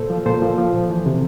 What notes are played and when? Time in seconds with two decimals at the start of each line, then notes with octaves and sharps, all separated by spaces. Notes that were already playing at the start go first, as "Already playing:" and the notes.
Already playing: A#2 A4 C5
0.10 F3
0.26 A#2 A4 C5
0.42 F3
0.58 F3
0.74 A#2
0.90 E3
1.06 C3